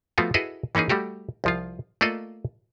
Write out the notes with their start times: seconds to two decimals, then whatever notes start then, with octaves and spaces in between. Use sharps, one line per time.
0.18 F3 A3 B3 F4 F#4
0.34 E4 F#4 G#4 A4 B4 D#5
0.75 E3 A#3 C#4 D#4 G#4
0.89 G3 A3 F#4 G4
1.44 C2 F3 F4
2.01 A3 A#3 F4 A4 D5 D#5